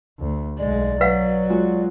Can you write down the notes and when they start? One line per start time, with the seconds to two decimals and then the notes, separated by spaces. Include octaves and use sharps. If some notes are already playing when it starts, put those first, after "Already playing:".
0.20 D2
0.58 B1 G#3 D5
1.01 F#3 B4 F5 F#5
1.50 G#3 F4 F#4